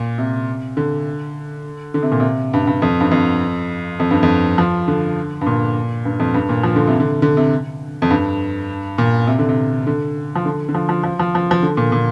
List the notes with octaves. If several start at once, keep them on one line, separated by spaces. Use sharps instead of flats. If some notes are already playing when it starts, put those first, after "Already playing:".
Already playing: A#2
C3
D3
D3
C3
A#2
C3
G2
G2
F2
G2
F2
F2
G2
F2
F3
D3
G2
A#2
G2
F2
G2
A#2
F3
D3
C3
D3
D3
C3
F2
G2
A#2
C3
D3
C3
D3
F3
D3
D3
F3
F3
F3
F3
F3
F3
D3
A#2
A#2